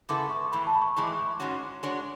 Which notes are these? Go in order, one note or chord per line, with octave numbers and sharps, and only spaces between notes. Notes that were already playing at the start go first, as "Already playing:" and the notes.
C#3 G#3 B3 E4 A4 D6
C#6
A2 E3 A3 B5
A5
B5
C#6
A2 E3 G#3
D6
C#6
D6
G#2 G#3 C#4 F#4
G#3 D4 F#4 C#5 C#6